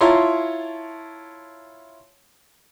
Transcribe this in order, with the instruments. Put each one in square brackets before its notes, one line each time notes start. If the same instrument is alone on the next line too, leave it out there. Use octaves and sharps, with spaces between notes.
[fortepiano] E4 F4 C#5 A5 A#5 C6